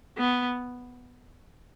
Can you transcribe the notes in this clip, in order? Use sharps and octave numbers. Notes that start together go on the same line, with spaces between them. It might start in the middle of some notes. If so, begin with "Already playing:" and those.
B3